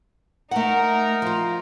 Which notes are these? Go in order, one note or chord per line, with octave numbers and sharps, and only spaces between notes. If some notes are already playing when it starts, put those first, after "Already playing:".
A3 D#4 A#4 F#5
F3 F4